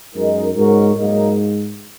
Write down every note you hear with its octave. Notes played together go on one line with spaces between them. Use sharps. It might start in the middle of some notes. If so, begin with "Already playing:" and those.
F#2 G#3 D#4 A#4
G#2 C#3 G#3 C#4 F#4 A#4
G#2 F#3 A#3 D#4 A#4